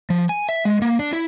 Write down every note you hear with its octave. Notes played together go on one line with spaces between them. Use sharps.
F3
G#5
E5
G#3
A#3
D4
E4